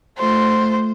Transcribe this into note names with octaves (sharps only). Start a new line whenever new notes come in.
A3 F4 C5